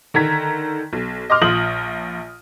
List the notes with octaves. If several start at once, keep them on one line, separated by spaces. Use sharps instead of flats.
D3 D#3 A#5 G#6 B6
B1
D#5 C6 D6 F6
A#1 F4 D#6 F#7